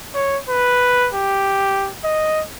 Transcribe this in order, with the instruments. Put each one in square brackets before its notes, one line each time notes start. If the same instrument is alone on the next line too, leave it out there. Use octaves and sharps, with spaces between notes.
[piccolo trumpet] C#5
B4
G4
D#5